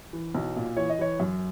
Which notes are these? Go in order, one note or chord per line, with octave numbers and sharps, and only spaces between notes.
E3
B1
A#2
E3 C#5
D#5
E3 C#5
F#2